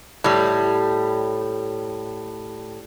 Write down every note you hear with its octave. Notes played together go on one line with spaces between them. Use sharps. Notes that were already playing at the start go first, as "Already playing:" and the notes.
A2 G3